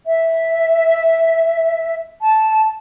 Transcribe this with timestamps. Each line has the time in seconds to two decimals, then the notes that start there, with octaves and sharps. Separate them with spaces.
0.06 E5
2.21 A5